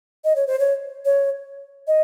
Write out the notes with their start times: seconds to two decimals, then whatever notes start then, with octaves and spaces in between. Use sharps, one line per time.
0.24 D#5
0.36 C#5
0.47 C5
0.59 C#5
1.05 C#5
1.87 D#5